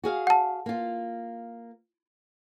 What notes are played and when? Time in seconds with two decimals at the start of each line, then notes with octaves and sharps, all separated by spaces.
0.04 F#4 G#4 F5
0.27 F#5 A5
0.66 A#3 F4